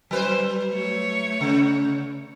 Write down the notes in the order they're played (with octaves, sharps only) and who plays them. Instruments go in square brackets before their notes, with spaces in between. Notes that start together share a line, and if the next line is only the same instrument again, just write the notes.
[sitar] F#3 B4 C5 [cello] G3
[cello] A3 C#5
[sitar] C#3